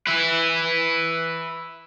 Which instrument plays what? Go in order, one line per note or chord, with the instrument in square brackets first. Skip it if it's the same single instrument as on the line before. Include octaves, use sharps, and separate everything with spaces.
[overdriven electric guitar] B4 E5